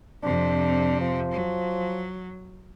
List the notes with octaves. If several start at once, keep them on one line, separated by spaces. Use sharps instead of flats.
F2 C3 D4
F3
F#3